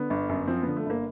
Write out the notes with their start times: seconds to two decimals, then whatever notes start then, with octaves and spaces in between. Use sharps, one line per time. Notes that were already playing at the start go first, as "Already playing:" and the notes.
Already playing: D3 B3
0.10 G1
0.29 F#2
0.47 F3 C4
0.63 D3 B3
0.77 A3
0.86 G1 A#3